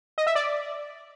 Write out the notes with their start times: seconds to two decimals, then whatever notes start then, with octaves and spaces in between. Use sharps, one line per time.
0.18 D#5
0.27 E5
0.35 D5